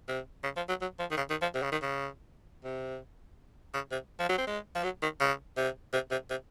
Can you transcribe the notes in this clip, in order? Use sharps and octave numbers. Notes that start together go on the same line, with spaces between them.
C3
C#3
F3
F#3
F#3
F3
D#3
C#3
D#3
F3
C3
C#3
D#3
C#3
C3
C#3
C3
F3
F#3
C4
G#3
F3
F#3
D#3
C#3
C3
C3
C3
C3